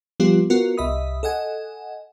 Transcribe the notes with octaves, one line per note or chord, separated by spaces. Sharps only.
F3 G3 B3 F4 G4
B3 F4 F#4 A#4
C2 D#5 E5 B5 D#6
A4 D#5 F#5 G#5